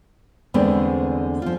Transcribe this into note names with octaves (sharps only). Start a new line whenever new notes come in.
E2 D3 G#3 A3 B3 C4
F3 F4